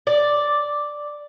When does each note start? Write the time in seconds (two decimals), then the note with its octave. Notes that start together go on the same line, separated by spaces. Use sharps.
0.07 D5